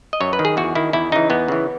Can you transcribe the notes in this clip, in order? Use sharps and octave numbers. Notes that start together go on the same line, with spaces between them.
D#5
F#2 C#5
B4
D#3
G#4
E2 F#4
D#3 E4
E2 E4
C#3 E3 D#4
E2 B3
C#3 E3